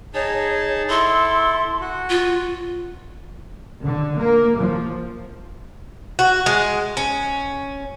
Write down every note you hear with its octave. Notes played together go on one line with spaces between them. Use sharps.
D#4 G#4 C#5 A5
E4 A4 C6
F#4
F4
D3
A#3
F3
F#4
G#3
C#4